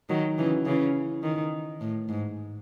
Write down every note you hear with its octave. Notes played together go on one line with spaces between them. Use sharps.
D#3 F#3
C#3 E3
C#3 E3
D#3
A2
G#2